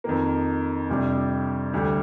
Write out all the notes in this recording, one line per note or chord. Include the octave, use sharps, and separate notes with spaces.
F2 D#3 A#3
F2 C3 G3 D4
D2 D3 G3